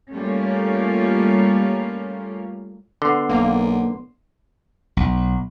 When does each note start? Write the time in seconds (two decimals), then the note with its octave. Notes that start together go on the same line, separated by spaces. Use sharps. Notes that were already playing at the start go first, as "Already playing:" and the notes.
0.11 G3 A3 A#3 C#4 F4
3.02 D3 B3 C6
3.29 B1 A#3
4.97 B1